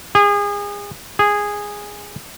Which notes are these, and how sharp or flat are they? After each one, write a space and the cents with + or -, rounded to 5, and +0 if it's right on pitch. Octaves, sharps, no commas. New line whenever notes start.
G#4 -30
G#4 -10